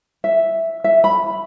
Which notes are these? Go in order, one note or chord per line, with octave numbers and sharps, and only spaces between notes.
E5
E5
B5